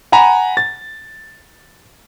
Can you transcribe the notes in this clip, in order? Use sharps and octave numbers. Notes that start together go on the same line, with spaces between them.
F#5 G#5 A#5 B5
A6